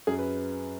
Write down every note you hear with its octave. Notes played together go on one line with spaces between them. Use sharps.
F#2 G#4
B4